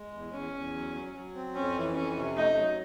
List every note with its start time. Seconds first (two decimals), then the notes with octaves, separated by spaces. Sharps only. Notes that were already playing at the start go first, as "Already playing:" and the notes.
Already playing: G#3
0.13 E2
0.33 E2 C#4
0.53 E2
0.74 F#3
0.94 F#3
1.15 F#3
1.35 C4
1.55 F2 C#4
1.76 E3
1.96 F2 C#4
2.16 C3
2.36 A3 D#4
2.56 F#3